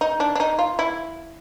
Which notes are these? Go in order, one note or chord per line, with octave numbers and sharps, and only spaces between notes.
D#4
D4
D4
D#4
F4
E4